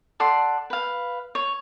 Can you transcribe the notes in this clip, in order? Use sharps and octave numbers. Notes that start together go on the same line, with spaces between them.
A4 D5 F#5 C6
B4 F5
C#5